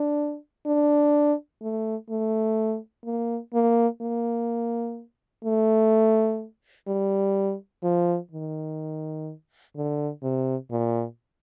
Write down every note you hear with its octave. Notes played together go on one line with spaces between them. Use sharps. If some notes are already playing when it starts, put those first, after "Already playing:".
Already playing: D4
D4
A3
A3
A#3
A#3
A#3
A3
G3
F3
D#3
D3
C3
A#2